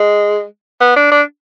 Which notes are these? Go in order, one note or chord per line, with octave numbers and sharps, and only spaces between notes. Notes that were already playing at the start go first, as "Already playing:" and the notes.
Already playing: G#3
B3
D4
D4